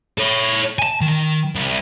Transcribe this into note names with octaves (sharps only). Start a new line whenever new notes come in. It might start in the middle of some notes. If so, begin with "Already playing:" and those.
A4 C#5
G#5 A5
D#3
C2